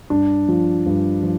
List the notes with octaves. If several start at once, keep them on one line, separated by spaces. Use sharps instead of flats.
G2 D4
F3
G2
F3